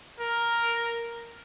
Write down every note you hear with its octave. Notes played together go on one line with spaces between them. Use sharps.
A#4